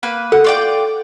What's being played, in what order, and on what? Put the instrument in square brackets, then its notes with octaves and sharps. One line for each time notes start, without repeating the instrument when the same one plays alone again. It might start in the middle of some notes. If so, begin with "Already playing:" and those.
[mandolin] A#3 B4 B5
[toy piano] A4 [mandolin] F#5
[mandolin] F4 D5 G5